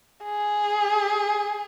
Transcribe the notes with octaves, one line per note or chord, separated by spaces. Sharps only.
G#4